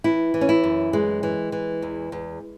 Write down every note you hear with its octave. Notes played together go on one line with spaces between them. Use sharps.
E3 E4
E3
C#4
E4
F#2
E3 G#3
E3
E3
E2
E2